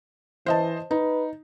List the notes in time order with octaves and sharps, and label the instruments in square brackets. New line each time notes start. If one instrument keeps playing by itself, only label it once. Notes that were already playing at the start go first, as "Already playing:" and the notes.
[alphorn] E3 [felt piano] C5 D#5 A5
[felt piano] D#4 [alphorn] B4